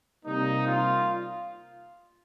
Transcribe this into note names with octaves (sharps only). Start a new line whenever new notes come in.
C3 G3 A#3 D#4
F4